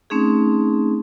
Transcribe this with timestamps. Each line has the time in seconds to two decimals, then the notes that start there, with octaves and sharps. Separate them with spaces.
0.10 A3 C4 C#4 D#4 G#4